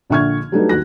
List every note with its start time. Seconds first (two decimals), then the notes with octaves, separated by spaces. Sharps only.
0.10 A#1 D3 E5 C#6 F6 G#6
0.52 F#3 G3 A3 D4 D#4 B4
0.69 D#2 F#4 F#6 A#6